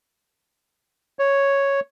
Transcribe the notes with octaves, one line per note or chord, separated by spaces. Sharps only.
C#5